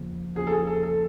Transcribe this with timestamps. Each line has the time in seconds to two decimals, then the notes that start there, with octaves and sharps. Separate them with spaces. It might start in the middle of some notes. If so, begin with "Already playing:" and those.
Already playing: E2 C#3 F3 A#3
0.35 E2 C#3 F3 A#3 G#4
0.47 A4
0.51 G#4
0.67 A4
0.83 A4